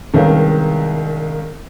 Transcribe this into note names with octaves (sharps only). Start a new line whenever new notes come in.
C2 D#3 G#3 C#4 B4 F5